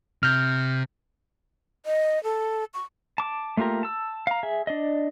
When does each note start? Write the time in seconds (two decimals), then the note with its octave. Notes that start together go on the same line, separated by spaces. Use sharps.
0.23 C3 F6 G6
1.85 D#5
2.24 A4
2.74 C#6
3.18 A5 D6
3.57 A3 A#3 F4 G4 A#4
3.83 A5 E6
4.27 F5 A#5
4.43 G#4 E5
4.67 D4 D5 D#5